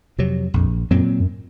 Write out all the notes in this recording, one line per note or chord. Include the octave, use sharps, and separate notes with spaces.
F2 C3 F#3
A#1 F2
F#2 A#2 F#3 C4
F#2